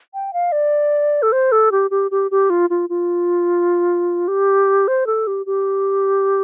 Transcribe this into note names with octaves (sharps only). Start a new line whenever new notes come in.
G5
F5
D5
A4
C5
A4
G4
G4
G4
G4
F4
F4
F4
G4
C5
A4
G4
G4